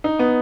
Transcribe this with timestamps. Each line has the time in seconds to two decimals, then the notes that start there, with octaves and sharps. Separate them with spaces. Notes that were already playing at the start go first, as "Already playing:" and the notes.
0.04 D#4
0.19 B3